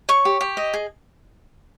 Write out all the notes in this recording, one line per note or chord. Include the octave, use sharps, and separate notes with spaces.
C#5 C#6
G4
G4
D#5
G#4